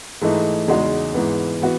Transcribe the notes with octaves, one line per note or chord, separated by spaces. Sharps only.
G#2 E3 A3 D#4
E2 C#3 G#3 D#4 F#4
G#2 E3 B3
E3 B3 F#4